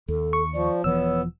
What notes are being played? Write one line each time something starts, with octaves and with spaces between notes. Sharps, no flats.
D#2 A4
C#6
F3 D5
E1 E3 F3 B3 C#5 E6